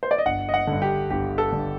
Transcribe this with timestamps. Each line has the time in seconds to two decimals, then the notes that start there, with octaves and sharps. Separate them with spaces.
0.03 C5
0.11 D5
0.18 D#5
0.26 G1 F#5
0.49 D#5
0.54 F#5
0.67 G2 D3
0.82 G4
1.10 G1 G4
1.38 A4
1.52 G2 D3